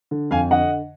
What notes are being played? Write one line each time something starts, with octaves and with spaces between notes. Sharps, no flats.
D3
F2 F5 G#5
D3 D#5 F#5